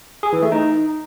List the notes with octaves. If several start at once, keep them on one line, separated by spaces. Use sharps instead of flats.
G#4
E3
A3
D#4